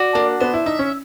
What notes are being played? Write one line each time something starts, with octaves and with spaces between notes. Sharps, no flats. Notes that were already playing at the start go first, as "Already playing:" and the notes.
Already playing: F#4 D5
A#3 D4
B3 C5
E4
D#4 E5
C#4